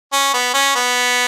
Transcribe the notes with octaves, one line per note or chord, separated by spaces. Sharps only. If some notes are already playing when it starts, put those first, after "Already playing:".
C#4
B3
C#4
B3